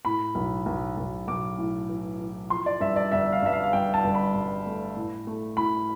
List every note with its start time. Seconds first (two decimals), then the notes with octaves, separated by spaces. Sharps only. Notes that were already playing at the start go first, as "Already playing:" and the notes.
0.05 A2 B5
0.35 B1
0.66 B1
0.97 B1
1.28 B1 D6
1.58 A2
1.89 E3
2.20 E3
2.50 F3 C6
2.66 D5
2.80 G2 E5
2.96 D5
3.12 G1 E5
3.32 F5
3.43 G2 E5
3.53 F5
3.64 F5
3.73 G2 G5
3.94 A5
4.04 G1
4.14 B5
4.34 G2
4.66 A3
4.97 A2
5.27 A3
5.57 A2 B5